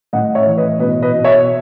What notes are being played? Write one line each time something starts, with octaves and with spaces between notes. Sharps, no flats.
A2 D#5 F#5
C#5 E5
E3
B4 D#5
B2 B4 D#5
B4 D#5
B2
C#5 E5